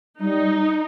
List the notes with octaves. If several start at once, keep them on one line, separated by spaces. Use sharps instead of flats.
G3 D#4